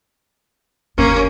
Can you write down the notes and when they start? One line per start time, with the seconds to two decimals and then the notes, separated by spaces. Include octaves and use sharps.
0.98 F#1 D#2 A#3 C#4